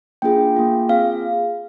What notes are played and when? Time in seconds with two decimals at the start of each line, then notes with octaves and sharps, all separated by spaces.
0.22 A#3 D4 F4 G#4 G5
0.56 A#3 F4 G#4
0.89 C4 F4 G#4 F5